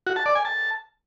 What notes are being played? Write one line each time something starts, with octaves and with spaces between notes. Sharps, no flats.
F#4
A5
D5
G#5
A5